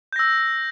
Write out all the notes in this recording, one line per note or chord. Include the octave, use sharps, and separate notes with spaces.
E6 G6 A#6